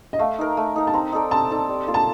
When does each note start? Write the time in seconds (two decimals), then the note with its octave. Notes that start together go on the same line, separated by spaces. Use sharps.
0.13 D#5
0.19 A3 F5
0.38 D#4 A#4
0.57 A3
0.76 D#4 A#4
0.87 A5
0.94 C4 A#5
1.12 D#4 A4 D5
1.31 C4 A5
1.50 D#4 A4 D5
1.69 G3
1.87 A#3 F4 A4
1.94 A5